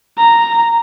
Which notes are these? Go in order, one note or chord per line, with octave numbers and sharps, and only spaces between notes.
A#5